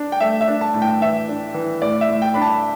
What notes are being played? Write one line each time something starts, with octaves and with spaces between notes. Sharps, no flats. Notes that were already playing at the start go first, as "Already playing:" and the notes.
Already playing: D4
G5
A3 E5
E5
D4
A5
A2
G5
E3 E5
D4
E3
A2 D5
E5
A2
G5
D4 B5
A5